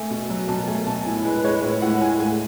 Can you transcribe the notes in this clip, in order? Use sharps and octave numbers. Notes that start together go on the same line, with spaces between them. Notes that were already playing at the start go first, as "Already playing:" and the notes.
Already playing: A3 G#5
B2
F#3
B2 A5
A3 G#5
B2 A5
A2 G#5
G#3 B4
B4
G#3 C#5
A2 C#5
A2 F#5
G#3 G#5
A3 G#5